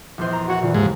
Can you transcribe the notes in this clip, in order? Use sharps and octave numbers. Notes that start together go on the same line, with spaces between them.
A#1 E2 C5
A#5
F#4 C#5 F#5
A#2 C#3 E3
D#2 G#2